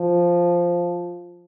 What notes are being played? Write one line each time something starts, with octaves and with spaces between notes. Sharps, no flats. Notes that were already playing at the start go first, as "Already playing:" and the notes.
Already playing: F3